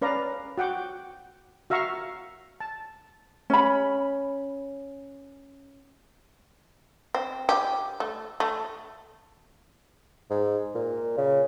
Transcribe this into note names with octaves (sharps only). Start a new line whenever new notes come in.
C#4 B4 D5 F5 A#5
F#4 F#5 G5 D6
F#4 E5 F5 A#5 C#6
A5
C#4 B5
C4
G4
A3
A3
G#2
A#2
C#3